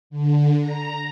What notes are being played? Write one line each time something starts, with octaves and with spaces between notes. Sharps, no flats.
D3
A#5